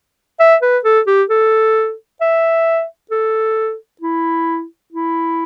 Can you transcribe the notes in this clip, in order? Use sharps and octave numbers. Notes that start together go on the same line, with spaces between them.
E5
B4
A4
G4
A4
E5
A4
E4
E4